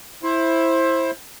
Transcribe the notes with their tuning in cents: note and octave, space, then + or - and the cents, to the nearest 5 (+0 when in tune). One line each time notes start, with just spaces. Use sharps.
E4 +0 C5 +20 E5 +0